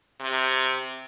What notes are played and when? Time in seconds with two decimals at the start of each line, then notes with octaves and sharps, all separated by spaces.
0.21 C3